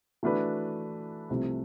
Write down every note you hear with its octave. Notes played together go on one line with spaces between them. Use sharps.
E3 A3 D4 F#4 B4
C2 C3 F3 A3